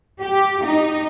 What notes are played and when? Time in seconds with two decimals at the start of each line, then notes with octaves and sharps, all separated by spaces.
0.22 G4
0.65 D#4